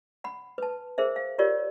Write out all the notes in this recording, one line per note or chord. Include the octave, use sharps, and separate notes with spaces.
F#5 B5
B4 A5
G#4 A#4 C5 E5
F5
F4 G4 A#4 C#5 D5